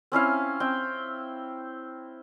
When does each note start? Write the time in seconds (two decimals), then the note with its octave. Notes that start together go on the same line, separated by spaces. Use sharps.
0.12 C4 C#4 E4 F5
0.60 C4 G5